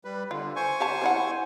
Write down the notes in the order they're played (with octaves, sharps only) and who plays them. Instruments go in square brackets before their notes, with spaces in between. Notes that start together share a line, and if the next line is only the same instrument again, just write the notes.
[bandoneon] G3 B4
[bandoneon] D3 [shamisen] F4
[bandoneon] C5 G#5 C#6
[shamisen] G4 F5 A5
C4 E4 F#5